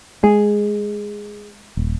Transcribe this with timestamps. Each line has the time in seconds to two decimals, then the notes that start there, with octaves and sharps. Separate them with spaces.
0.24 G#3 G#4
1.77 D#1